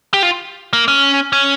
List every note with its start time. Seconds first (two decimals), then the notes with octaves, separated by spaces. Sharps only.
0.14 G4
0.23 F4
0.73 A#3
0.88 C#4
1.33 C#4